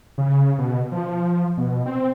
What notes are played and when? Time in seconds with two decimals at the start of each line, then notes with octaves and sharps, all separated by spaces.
0.18 C#3
0.58 B2
0.92 F3
1.57 B2
1.86 C4